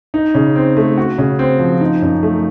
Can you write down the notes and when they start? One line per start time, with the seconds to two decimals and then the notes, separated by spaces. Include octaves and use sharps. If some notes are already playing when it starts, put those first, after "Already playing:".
0.14 D#4
0.35 C#3
0.56 C4
0.77 A3
0.98 F#4
1.18 C#3
1.39 C4
1.59 F3
1.81 D#4
2.02 F#2
2.23 A3